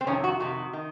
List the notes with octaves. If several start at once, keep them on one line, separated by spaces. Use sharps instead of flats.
C4
F2 C3 D#3 C#4
F#4
F2 C3 D#3 F#4
D#3